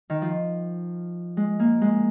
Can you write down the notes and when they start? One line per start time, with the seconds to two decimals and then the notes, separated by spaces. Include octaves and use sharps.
0.10 D#3
0.22 F3
1.37 G#3
1.59 A#3
1.81 G#3